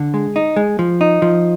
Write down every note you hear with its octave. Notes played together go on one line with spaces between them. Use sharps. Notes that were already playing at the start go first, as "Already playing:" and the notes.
Already playing: D3
G#3
D#4
G#3
F3
D#4
F3